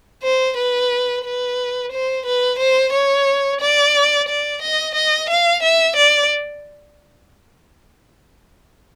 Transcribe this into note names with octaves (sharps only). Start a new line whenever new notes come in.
C5
B4
B4
C5
B4
C5
C#5
D5
D5
D#5
D#5
F5
E5
D5